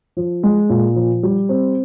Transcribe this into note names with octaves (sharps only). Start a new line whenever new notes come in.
F3
G#3
A#2
F3
G3
C4